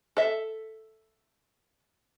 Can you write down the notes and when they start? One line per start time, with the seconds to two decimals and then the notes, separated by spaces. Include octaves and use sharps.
0.17 A4 E5